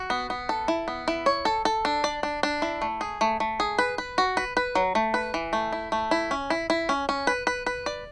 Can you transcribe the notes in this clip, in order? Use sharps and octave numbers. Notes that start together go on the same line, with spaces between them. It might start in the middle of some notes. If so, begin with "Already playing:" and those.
Already playing: F#4
B3
B3
A4
E4
B3
E4
C#5
A4
A4
D4
D5
D4
D4
E4
A3
G#4
A3
A3
G#4
B4
B4
F#4
B4
B4
F#3
A3
B4
E3
A3
E4
A3
E4
C#4
E4
E4
C#4
C#4
B4
B4
B4
D5